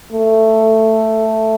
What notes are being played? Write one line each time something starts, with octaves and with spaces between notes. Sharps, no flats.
A3